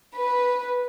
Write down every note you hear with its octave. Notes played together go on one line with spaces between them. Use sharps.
B4